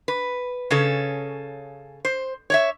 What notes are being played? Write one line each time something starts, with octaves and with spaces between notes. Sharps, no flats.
B4
C#3 C#4 A4
C5
C#5 D5 E5